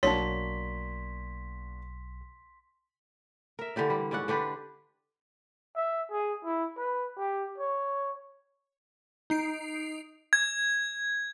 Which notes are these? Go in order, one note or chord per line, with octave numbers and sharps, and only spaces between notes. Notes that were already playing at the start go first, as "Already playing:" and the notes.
B1 A#3 D4 F#4 C#5 A5 C6 B6
A#4 E5
D3 E3 G4 D5
G3
G#2 C#4 D5 F#5
D3 D4 G4 B4
E5
G#4
E4
B4
G4
C#5
D#4 C7 D7
G#6